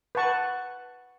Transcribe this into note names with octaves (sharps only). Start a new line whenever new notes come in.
B4 F#5 A5 C#6